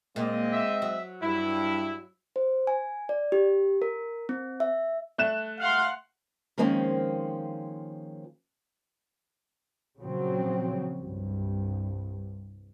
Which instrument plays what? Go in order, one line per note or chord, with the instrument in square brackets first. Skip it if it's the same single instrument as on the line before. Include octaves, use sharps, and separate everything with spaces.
[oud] A#2 [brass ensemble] G#3 C4 D#5
[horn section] E5
[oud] F#3
[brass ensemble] G2 [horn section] E4
[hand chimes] C5
G#5
D5
G4
A#4
C4
E5
[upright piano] A3 F#6 E7
[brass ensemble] F5 [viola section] F#5 C6
[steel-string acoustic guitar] D#3 F3 G#3 A#3 C4 C#4
[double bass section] A#2 C#3 F3 F#3 C4
C2 G2